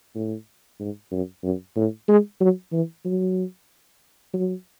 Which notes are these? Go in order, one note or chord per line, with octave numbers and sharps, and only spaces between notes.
A2
G#2
F#2
F#2
A2
G#3
F#3
E3
F#3
F#3